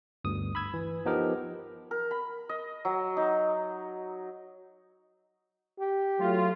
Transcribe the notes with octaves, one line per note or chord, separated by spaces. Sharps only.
G1 D2 G2 D#6
B5 E6 G#6
E3
F3 B3 D#4 G4 A#4
A#4
B5
D#5
F#3
D#4
G4
F#3 A3 F4